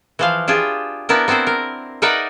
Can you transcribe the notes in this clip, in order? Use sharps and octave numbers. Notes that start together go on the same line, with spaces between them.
E3 F3 F5
D4 F4 G4 G#4
B3 D4 E4 A#4
B3 C4 E4 A#4 C5
A#4
D#4 A#4 B4 D5 E5 F#5